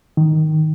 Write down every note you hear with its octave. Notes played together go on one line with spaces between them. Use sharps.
D#3